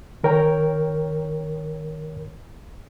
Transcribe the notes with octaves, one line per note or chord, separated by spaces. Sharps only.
D#3 A#4 C#5 G5